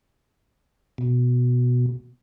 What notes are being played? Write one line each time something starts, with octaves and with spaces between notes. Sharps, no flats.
B2